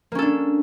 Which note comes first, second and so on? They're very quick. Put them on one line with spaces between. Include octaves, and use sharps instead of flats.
A#3 C#4 A4 D4